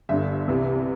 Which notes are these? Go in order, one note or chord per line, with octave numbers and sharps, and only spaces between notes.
G1 G2 D3 E5
C2 C3 E3